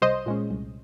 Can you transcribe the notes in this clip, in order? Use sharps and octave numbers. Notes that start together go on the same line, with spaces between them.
C2 C5 D#5
A#2 G#3 C#4
C2